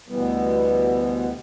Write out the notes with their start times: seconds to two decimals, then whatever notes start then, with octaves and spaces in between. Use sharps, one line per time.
0.08 D2 B2 E3 G3 B3